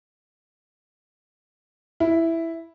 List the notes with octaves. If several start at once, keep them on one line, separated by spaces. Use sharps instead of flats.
E4